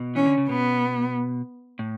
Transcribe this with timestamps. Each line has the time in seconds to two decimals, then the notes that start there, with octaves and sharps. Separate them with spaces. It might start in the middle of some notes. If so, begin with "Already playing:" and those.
Already playing: B2
0.15 E3 C#4
0.26 D3
0.38 C#3
0.48 B2 B3
1.79 A2